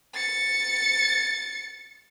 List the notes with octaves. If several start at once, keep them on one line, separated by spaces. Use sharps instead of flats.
A6 C#7